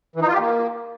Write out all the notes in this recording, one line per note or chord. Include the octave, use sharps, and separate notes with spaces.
E3
D#4
F4
G4
A#3